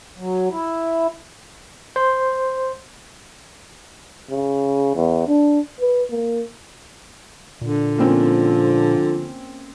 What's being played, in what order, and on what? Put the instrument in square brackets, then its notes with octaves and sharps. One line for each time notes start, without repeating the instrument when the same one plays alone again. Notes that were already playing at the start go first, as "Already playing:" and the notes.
[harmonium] F#3
E4
[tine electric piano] C5
[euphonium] C#3
E2
D4
B4
A#3
[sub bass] A#2 [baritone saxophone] D3
[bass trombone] F3 [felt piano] A#3 C4 C#4